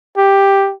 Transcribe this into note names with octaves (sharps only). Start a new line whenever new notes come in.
G4